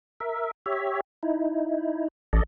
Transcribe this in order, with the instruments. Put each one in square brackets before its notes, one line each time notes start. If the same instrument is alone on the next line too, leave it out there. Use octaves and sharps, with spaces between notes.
[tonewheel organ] A#4 E5
G4 C#5 E5
D#4 E4
[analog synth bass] A1 [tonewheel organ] A4 D5 D#5